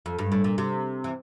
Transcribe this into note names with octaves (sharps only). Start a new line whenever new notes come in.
F2
G2
A2
A#2
C3
E3